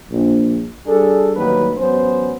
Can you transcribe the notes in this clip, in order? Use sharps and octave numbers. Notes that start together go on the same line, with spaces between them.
A#1
G3 D4 G#4 A4
A1 G2 D#3 F#3 A#3 B4
A1 F#3 B3 C#4 C5